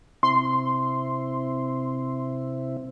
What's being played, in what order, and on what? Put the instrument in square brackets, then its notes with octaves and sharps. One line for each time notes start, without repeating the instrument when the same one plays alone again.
[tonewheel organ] C3 C4 E4 [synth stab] C6